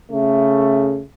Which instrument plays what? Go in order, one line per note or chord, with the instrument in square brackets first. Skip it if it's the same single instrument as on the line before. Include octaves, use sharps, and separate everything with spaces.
[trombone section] C#3 A3